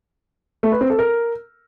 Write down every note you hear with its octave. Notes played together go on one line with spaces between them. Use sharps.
A3
B4
C4
A4
A#4